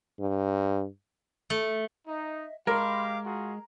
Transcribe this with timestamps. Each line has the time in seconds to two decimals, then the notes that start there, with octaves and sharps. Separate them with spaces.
0.20 G2
1.50 A3
2.07 D#4 D#5 E5
2.67 G#3 G4 A#4 F5 B5 C6 D6
3.25 F4 F#4 G#4 A#5